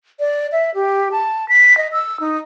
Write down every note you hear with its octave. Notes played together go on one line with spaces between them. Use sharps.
D5
E5
G4
A5
B6
D#5
E6
D#4